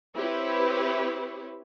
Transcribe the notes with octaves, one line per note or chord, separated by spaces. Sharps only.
C4 E4 G4 B4 C#5